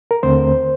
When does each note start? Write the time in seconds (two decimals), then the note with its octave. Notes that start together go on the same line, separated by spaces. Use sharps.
0.11 A#4
0.23 D#2 D3 A3 C4 C5